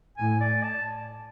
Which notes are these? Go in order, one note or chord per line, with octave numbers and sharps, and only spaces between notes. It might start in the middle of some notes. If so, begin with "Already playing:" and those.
A2 G#5
D5
A5